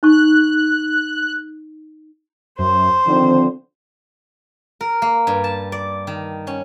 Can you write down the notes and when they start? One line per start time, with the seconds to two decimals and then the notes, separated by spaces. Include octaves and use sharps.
0.03 D#4 C#6 F#6
2.59 F#2 C5
3.07 D3 D#3 F3 C4
4.81 A#4
5.02 A#3
5.27 G2
5.44 A5
5.72 D5
6.07 D#3
6.47 C#4